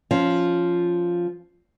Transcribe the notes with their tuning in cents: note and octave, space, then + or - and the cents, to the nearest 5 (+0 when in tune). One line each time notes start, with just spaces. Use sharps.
F3 +0 C#4 +0